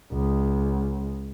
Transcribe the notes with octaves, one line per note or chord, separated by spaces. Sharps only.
C#2